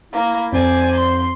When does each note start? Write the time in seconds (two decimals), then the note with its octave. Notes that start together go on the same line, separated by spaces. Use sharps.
0.13 A#3 E4
0.53 F2 C5 D5 G#5
0.96 C6